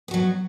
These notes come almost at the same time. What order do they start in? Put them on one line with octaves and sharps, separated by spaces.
B3 F#4 F#3